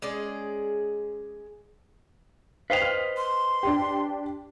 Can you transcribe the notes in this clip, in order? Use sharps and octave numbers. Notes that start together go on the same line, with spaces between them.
G#3 C#4 G#4 D5
B4 C5 D#5 F5 G5 F7
F6
C6
D4 G4